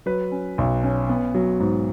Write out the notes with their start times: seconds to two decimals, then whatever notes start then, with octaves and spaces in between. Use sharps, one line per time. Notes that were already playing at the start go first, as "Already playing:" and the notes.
0.06 F#3 B4
0.32 C#4
0.58 B1
0.83 C#4
1.09 B3
1.34 F#3
1.60 G#2